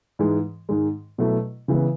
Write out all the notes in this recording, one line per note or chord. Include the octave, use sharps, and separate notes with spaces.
G#2 E3 G#3
G#2 D#3 G#3
B2 F#3 A3 E4
C#3 E3 G#3 B3